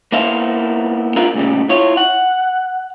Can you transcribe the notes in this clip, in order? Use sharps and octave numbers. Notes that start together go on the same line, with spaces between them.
A#3 B3 E4 C5 E5 F5
D4 E4 F4 A#4
D2 A#2 C#3 G3
E4 F4 C#5
F#5